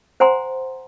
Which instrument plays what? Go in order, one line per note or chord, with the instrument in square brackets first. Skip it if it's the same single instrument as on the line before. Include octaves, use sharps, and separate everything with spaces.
[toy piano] C5 F#5 G#5 A#5 C6